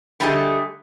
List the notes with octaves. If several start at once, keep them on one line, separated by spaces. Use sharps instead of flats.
D3 G3 A3 G4 G#4 D#5